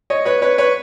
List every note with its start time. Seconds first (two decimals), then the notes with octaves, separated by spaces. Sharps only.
0.10 C#5 D#5
0.25 B4 C#5
0.42 B4 C#5
0.58 B4 C#5